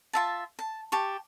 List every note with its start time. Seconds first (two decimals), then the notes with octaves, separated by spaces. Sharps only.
0.13 F4 E5 A5
0.59 A5
0.92 G4 A5 C#6